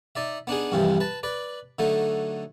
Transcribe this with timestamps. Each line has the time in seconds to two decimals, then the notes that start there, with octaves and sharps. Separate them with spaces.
0.15 D#4 D5 E5
0.47 B3 D4 D#4 G#4
0.72 C2 G2 C3 E3 F3
1.00 B4 A5
1.23 B4 D5
1.79 D3 F#3 A3 D#4